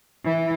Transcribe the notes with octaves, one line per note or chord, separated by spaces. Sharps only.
E3